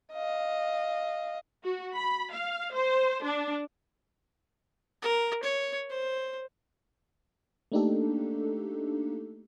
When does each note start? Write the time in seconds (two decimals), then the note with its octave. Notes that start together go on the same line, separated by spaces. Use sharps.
0.13 D#5 F5
1.63 F#4
1.95 B5
2.32 F5
2.74 C5
3.24 D4
5.02 A#4
5.43 C#5
5.90 C5
7.72 A3 A#3 D4 D#4 G4 A4